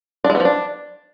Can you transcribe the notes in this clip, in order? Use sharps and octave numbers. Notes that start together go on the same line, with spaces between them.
D4
G#3
B3
F3
D4